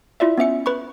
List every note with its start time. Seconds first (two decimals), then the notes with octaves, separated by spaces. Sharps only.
0.20 E4 F4 D5 E5
0.38 B3 C#4 E5 C#7
0.66 B4 B5 C#6